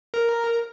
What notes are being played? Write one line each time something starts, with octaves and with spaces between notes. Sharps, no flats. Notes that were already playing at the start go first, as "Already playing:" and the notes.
A#4